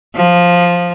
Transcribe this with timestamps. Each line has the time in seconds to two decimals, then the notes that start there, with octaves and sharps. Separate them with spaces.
0.16 F3